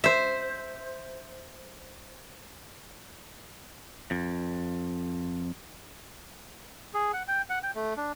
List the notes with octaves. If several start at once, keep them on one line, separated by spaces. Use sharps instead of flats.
C5 E5
F2
G#4
F#5
G5
F#5
G5
A3
D4